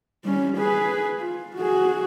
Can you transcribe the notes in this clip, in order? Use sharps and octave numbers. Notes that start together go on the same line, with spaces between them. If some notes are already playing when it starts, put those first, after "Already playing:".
G3 C#4
G#4 B4
F4
F#4 G#4